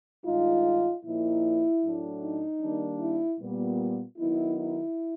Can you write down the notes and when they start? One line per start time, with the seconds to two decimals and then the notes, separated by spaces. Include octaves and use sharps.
0.26 G2 D#3 G#3 D#4 F4
1.04 A#2 F3 A#3 D#4 E4
1.83 A2 F#3 A3 D4
2.22 D#4
2.61 D#3 G3 A#3 D4
3.00 E4
3.40 A#2 G3 B3
4.18 D#3 F#3 B3 D#4 E4
4.58 E4